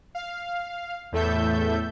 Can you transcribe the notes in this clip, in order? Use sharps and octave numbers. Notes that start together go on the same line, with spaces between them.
F5
E2 A2 A3 A4 E5 G6